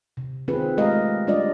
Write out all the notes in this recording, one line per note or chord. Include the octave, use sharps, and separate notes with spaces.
C3
D#3 C4 F4 G#4 B4
G#3 A3 G4 A#4 D#5 F5
G3 D4 F4 D5 D#5